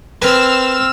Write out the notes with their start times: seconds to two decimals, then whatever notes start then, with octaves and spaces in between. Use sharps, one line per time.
0.22 C4 A#4 B4 G#5 E6 F6 E7